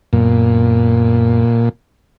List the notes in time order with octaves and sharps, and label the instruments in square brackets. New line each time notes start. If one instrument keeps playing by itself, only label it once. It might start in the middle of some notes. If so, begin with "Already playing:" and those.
[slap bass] F#2 B3 [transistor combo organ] A#2